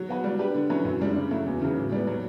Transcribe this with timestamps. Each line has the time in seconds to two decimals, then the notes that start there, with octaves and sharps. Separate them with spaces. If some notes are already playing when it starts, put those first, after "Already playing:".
Already playing: F#3
0.09 B3 F#4 B4
0.24 G3
0.39 D4 G4 B4
0.54 D3
0.70 F#3 C#4 E4 B4
0.85 F#2
1.00 C#3 G3 D4
1.15 C#3
1.31 F#3 A3 E4
1.46 E2
1.62 C#3 F#3 B3
1.76 A2
1.92 G3 B3
2.07 F#3